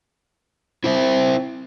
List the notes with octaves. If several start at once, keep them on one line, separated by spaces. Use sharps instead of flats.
C4 E4 C5 E5